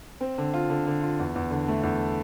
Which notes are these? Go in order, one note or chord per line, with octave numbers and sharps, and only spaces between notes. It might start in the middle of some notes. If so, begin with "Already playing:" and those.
C4
D3
F4
D3
D3
F4
E2
E2
D3
A3
E2